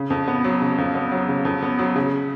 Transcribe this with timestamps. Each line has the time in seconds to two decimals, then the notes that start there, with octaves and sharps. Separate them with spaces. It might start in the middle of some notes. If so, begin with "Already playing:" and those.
Already playing: C#3
0.10 F2
0.28 B3
0.44 F#3
0.62 C#3
0.78 F2
0.95 B3
1.12 F#3
1.28 C#3
1.45 F2
1.63 B3
1.79 F#3
1.96 C#3